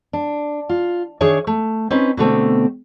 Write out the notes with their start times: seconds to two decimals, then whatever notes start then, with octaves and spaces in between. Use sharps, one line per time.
0.13 D4
0.69 F4
1.21 D#3 D4 G#4 C#5 E5
1.47 A3
1.91 C4 C#4 D#4 B4
2.17 B2 D3 A3 C4